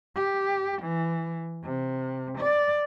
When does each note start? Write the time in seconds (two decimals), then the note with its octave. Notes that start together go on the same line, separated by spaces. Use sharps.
0.15 G4
0.82 E3
1.64 C3
2.38 D5